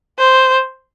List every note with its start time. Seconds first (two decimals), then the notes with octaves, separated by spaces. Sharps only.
0.19 C5